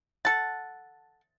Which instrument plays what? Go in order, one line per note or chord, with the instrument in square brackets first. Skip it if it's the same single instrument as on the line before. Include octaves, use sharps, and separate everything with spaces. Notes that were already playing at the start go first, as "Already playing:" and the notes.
[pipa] A4 F#5 [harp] A6